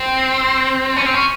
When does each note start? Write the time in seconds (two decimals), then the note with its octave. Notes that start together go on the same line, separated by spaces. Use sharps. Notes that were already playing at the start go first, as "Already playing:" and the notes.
Already playing: C4
0.97 C#4
1.06 C4
1.15 C#4